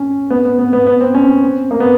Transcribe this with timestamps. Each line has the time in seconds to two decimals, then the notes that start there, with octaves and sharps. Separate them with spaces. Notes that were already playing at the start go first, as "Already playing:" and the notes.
Already playing: C#4
0.30 B3
0.45 B3
0.59 B3
0.73 B3
0.87 B3
1.01 C4
1.15 C#4
1.43 C4
1.71 A#3
1.80 B3